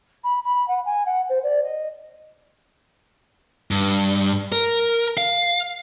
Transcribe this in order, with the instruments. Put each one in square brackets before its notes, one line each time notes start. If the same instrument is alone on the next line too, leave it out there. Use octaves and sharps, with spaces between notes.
[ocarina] B5
B5
F#5
G#5
F#5
C5
D5
D#5
[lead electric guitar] G2
A#4
F5